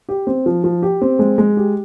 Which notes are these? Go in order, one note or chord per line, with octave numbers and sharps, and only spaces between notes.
G4
C4
F3
F3
G4
C4
G#3
G#3
G4